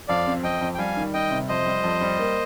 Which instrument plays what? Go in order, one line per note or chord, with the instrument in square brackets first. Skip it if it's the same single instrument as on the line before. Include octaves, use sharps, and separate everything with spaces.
[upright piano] F2 [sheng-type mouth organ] D5 F5
[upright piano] C4
[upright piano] F2 [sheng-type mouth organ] D#5 G5
[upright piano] F2
[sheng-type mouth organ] G5
[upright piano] G3 [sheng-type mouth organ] F5 G#5
[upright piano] D#3
[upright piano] G3 [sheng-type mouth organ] D#5 G5
[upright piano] C3
[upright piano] F2 [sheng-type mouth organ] C5 D#5
[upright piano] G3
F2
G3
A#3